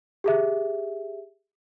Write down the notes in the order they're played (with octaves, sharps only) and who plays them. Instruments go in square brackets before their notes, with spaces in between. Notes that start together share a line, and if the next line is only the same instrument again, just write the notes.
[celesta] G4 G#4 E5